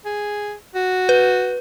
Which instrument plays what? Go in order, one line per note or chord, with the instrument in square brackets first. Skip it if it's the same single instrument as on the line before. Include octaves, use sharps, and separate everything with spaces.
[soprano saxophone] G#4
F#4
[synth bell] B4